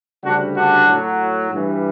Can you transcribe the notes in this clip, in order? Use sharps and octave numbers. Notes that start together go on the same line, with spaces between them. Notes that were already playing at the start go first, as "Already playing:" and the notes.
D2 C#3 G3 D4 F#4
D4 F#4
A2 F#3
G2 E3 G3